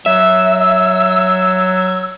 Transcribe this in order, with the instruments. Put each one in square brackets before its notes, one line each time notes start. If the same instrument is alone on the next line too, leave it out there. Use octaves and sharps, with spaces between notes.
[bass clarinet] F#3 [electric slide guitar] E5 [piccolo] E6